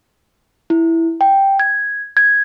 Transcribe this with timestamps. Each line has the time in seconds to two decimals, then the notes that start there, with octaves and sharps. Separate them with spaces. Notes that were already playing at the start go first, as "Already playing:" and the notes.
0.70 E4
1.21 G5
1.60 G#6
2.17 G#6